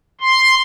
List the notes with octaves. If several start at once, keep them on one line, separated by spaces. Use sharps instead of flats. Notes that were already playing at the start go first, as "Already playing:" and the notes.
C6